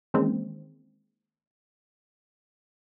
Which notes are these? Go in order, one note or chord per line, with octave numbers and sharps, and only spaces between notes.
D#3 E3 G#3 A#3 C4 C#4